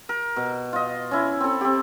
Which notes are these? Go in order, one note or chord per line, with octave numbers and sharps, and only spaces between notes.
A#4
B2
F4 D#5
C#4 E4
C4 A4
C4 G4